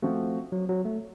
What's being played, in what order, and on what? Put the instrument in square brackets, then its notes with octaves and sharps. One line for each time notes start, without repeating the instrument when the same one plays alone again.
[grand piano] F3 C4 F#4 [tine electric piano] A3
[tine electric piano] F#3
F#3
A3